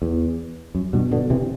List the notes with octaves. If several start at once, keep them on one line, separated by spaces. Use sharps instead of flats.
E2
F#2
G2 B2
B2 D3
C3 E3